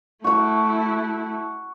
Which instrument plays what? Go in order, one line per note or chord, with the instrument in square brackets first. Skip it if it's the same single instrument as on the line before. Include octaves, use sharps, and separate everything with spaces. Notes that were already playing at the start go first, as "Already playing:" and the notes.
[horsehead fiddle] A3 E4 [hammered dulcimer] F#4 C#6